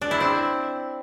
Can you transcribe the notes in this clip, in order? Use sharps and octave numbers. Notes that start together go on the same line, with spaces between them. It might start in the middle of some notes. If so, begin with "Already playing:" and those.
D4
E4
C4